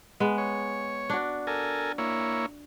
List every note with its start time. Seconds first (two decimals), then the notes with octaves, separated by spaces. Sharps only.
0.20 G#3 B3
0.38 C#5
1.10 D4 F#4
1.47 A4 A#4 G#5
1.98 A#3 E4 C#5